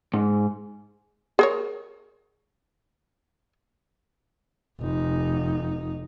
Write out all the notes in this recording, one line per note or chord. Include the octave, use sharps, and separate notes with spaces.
G#2
G#4 A#4 C#5
F1 D#4